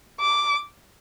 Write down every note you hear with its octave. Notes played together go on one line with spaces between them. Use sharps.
D6